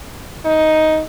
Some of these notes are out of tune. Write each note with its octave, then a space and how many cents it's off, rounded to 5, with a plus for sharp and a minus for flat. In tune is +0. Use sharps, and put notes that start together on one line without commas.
D#4 +10